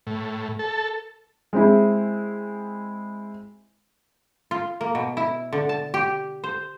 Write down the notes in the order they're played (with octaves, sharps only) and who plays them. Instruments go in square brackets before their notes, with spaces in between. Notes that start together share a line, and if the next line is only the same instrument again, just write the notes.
[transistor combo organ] A2
A4
[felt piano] G#3 C4 E4
[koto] F4
A#3
B2
E4
D3
A5
G4
C5